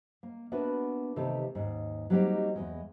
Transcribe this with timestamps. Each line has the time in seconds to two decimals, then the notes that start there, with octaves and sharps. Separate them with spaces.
0.23 A#3
0.52 B3 D4 E4 F#4 A#4 B4
1.16 C3 D#3 E3 A3 G4 A4
1.55 D#2 G#2 C#4
2.10 F#3 G3 A#3 C4 D#4 G4
2.56 E2 G#2 G#3